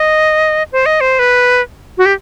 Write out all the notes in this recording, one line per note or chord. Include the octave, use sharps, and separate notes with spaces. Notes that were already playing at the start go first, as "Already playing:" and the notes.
Already playing: D#5
C5
D#5
C5
B4
F#4
G4